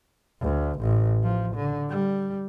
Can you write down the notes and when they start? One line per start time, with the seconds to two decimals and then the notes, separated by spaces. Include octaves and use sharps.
0.41 D2
0.80 A1
1.23 F3
1.55 D3
1.89 G3